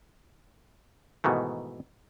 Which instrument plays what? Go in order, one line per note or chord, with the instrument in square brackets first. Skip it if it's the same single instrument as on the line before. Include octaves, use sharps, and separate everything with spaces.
[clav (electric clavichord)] G#2 B2 D#3 E3 A3